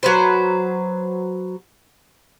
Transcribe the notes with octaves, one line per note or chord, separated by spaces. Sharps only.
F#3 B4 C5